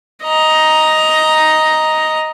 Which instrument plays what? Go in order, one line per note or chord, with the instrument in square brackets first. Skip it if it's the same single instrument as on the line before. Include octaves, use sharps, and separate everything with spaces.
[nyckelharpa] D#5 A#5